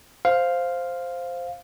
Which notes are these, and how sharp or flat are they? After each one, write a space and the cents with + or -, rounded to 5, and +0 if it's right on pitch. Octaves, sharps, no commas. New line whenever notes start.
C5 +0 F5 +0